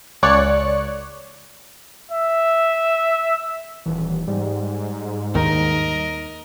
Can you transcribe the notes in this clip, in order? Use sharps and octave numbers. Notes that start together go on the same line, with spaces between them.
C#2 C#5 D5 F#6 C#7
E5
D#1 E3
G#2 G3
D#2 D#3 A#4 D#5